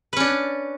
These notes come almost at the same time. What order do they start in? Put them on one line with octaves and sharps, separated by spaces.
B4 C#4 D4